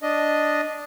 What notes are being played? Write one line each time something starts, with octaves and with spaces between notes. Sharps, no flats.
D4 D#5